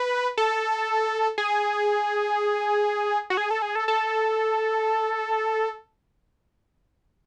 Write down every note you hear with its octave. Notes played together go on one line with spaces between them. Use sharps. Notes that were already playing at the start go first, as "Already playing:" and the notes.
Already playing: B4
A4
G#4
F#4
G#4
A4
G#4
A4
A4